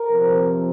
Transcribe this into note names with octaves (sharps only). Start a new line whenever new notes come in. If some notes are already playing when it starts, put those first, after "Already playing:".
Already playing: A#4
C3 F3 C4